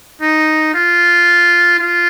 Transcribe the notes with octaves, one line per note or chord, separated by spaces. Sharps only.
D#4
F4
F4